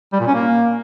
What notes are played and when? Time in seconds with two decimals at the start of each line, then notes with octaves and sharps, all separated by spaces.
0.13 G3
0.20 A#2
0.27 C#4
0.34 A#3